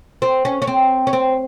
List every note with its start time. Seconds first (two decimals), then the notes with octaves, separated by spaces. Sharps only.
0.22 C4
0.45 C#4
0.62 C#4
0.67 C4
1.07 C#4
1.13 C4